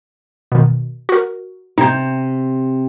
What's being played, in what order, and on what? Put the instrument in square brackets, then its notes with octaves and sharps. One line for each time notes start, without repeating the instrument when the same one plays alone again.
[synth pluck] B2 D#3
F#4 A#4
[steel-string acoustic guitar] C3 [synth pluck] D#4 G6